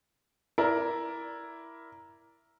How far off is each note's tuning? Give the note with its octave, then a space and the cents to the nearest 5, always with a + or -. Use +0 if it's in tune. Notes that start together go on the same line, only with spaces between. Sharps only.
E4 +5 A#4 +10 D5 -10